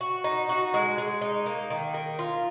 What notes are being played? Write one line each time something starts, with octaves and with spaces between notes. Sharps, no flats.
F#4
D#4
F#4
G#3
G#3
D#4
A#3
D#3
A#3
F4